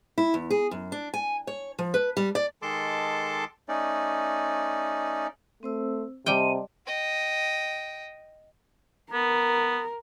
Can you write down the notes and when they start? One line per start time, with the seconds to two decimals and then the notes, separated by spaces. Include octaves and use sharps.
0.18 E4
0.34 E2
0.50 G#4
0.71 F#2
0.92 D4
1.14 G#5
1.47 C#5
1.79 F3
1.94 B4
2.17 G3
2.35 D5
2.62 D#3 G#3 A4 A5 C6 D6
3.69 A3 C#4 D#4 D5
5.63 A3 C4 C5 E6
6.26 C3 G3 D#5 G5 A5 C6 D#7
6.87 D#5 G5
9.13 B3 A#4